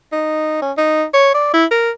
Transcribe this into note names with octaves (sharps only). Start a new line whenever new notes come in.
D#4
C#4
D#4
C#5
D5
E4
A#4